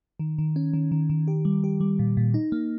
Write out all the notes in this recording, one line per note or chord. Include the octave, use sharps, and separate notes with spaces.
D#3
D#3
C#4
D#3
D#3
D#3
G4
G3
G4
G3
A#2
A#2
D#4
A#3